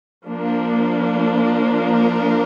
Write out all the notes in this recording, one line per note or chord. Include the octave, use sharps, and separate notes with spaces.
F3 A#3 D4
A#4